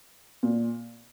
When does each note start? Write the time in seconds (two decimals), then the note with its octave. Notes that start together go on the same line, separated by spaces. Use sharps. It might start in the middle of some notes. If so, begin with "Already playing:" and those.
0.43 A#2